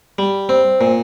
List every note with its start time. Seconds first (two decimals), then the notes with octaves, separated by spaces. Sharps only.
0.18 G3
0.49 C4
0.81 A#2